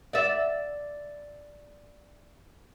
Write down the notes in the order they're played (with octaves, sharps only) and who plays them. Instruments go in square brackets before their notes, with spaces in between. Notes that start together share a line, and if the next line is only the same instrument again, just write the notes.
[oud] D5 E5